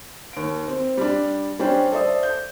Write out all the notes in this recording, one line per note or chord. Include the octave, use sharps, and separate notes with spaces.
D#2 D7
C4
G3 D4
G3 C#4 D4 C5 G5
A4 C5 D5 E5 D#6
G6